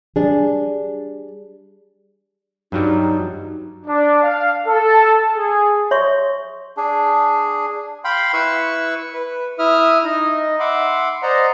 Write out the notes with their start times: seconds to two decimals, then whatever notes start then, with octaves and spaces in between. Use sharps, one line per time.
0.16 G3 D4 G#4
2.72 G2 F#3 G3 D#4
3.86 D4
4.23 F5
4.66 A4
5.35 G#4
5.91 C#5 E5 C6 C#6
6.77 D4 G#4
8.05 F5 G5 B5 C6
8.34 E4 B4 C#6 E6
9.14 B4
9.59 E4 E5 D#6 F6
10.04 D#4 D#5
10.60 E5 F#5 B5 C6 D6
11.22 C5 D5 D#5 F#5 A#5 C6